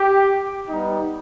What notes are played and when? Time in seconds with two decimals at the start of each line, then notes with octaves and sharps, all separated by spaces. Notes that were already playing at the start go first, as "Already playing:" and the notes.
Already playing: G4
0.68 G3 B3 D#4